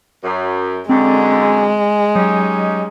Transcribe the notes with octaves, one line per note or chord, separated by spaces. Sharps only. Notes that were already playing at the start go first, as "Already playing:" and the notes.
F#2
F#2 D3 G#3 C4
F#3 C#4 D#4 G4